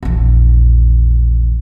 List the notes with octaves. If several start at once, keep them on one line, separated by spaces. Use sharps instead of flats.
A#1 E2